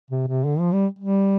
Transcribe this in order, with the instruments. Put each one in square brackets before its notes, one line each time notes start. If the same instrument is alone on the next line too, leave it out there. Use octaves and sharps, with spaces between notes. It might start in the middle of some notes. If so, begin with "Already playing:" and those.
[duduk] C3
C3
D3
F3
G3
G3